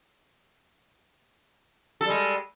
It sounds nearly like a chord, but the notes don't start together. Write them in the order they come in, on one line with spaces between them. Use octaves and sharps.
A4 G3 G#3